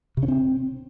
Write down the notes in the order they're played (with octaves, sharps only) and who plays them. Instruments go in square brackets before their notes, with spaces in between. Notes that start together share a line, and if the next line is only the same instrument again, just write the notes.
[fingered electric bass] C3
C#4
C4